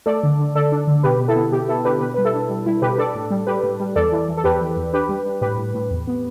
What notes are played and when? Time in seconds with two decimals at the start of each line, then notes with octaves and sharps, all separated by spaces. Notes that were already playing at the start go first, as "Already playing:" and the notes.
0.06 A3 A4 D5
0.23 D3
0.39 D3
0.55 D3 A4 D5
0.72 D4
0.87 D3
1.03 B2 G4 B4
1.19 B2
1.28 E4 A4
1.36 B3
1.52 B2 G4
1.69 B2 E4 A4
1.85 D4 G4 B4
2.01 B2 G4 B4
2.14 G3 B4
2.25 E4 A4
2.34 D4
2.49 G3
2.66 G3 E4
2.82 B2 G4 B4
2.98 D4 A4 D5
3.15 A2
3.31 G3
3.47 G3 G4 B4
3.63 A2
3.80 G3
3.96 E2 A4 D5
4.12 E3
4.29 E3
4.37 A4
4.44 E2 G4 B4
4.61 E3
4.77 E2
4.93 D4 G4 B4
5.09 G3
5.26 D4
5.41 A2 G4 B4
5.58 A2
5.74 A2
5.91 E2
6.07 B3